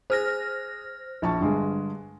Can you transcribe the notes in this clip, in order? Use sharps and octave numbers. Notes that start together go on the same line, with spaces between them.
G#4 C5 F6 A#6
A#1 A5 C#6
G2 D3 G#3